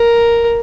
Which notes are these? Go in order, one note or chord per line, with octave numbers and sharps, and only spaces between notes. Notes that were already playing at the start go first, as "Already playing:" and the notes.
Already playing: A#4